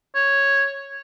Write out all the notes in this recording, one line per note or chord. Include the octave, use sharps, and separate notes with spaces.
C#5